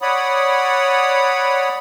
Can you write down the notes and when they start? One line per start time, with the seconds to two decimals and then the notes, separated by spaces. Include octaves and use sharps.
0.02 C#5 D5 F#5 B5 D#6